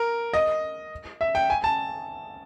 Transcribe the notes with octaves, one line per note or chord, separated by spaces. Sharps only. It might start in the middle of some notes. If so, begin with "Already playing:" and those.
Already playing: A#4
D#5
E5
G5
G#5
A5